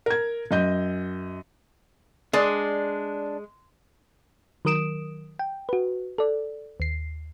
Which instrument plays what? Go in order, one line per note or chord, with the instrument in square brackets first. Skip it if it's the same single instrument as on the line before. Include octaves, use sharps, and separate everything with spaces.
[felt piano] A#4 G#6
F#2 D#5 G6
[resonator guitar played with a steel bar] G#3 [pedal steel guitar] D4 [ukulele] D5
[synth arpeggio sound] D#3 F#3 A#4 D#6 D7 E7
G5
F#4 B4
A4 D5
D#2 C7